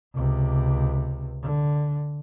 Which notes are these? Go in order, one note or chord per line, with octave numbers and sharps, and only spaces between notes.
C#2 C3
D3